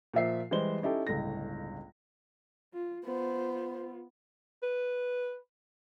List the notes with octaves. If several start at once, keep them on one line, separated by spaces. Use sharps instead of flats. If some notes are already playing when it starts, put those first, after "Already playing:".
A#2 F3 E5 C7
E3 G3 G#3 C5 G7
C#4 D#4 E4 G4 A4
G1 C#2 A2 G#3 A3 A#6
F4
B3 F4 C5
B4